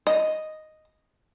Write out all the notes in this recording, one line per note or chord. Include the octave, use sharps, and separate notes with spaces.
D#5